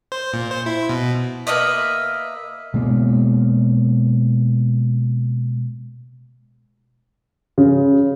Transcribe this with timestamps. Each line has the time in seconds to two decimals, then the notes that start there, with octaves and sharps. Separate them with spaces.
0.12 C5
0.33 A#2
0.51 C5
0.66 E4
0.89 B2
1.47 A#3 B4 D#5 E5
2.74 B2 G#3 A#3
7.58 C#3